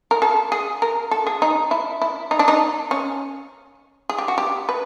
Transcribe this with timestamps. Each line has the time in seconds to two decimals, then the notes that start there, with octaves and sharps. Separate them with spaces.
0.11 A#4
0.22 A4
0.52 G#4
0.82 A#4
1.11 A4
1.27 G#4
1.42 D#4
1.71 E4
2.02 E4
2.31 D#4
2.39 D4
2.48 D#4
2.91 C#4
4.09 G#4
4.18 G4
4.28 F#4
4.38 G4
4.69 B4